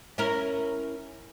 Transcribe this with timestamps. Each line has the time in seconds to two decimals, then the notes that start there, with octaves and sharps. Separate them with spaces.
0.18 C#4 E4 A#4